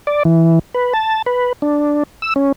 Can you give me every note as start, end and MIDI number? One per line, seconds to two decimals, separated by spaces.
0.07 0.23 74
0.25 0.59 52
0.75 0.93 71
0.93 1.22 81
1.26 1.53 71
1.62 2.03 62
2.22 2.34 88
2.36 2.52 61